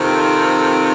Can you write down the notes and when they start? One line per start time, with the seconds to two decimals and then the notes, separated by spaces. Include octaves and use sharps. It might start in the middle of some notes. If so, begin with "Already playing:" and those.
Already playing: F2 C3 D#3
0.09 A4